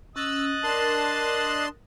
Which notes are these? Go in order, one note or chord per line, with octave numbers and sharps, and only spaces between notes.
C#4 D#5 E6 F#6 A6
D4 A#4 A5 C6